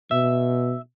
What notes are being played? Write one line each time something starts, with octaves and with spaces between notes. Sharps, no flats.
B2 E5